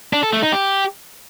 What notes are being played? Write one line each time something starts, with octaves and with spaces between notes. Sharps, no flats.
D4
A4
A3
D#4
G4